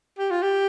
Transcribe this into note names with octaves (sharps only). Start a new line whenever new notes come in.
G4
F4
G4